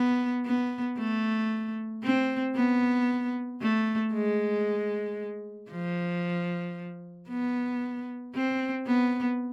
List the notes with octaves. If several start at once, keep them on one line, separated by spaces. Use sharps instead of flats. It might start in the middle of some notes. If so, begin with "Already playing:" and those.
Already playing: B3
B3
A3
C4
B3
A3
G#3
F3
B3
C4
B3